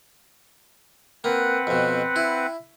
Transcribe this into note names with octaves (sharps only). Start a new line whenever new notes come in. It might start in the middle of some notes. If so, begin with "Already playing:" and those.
A#3 C4 B4 F#5
F2 B2
E4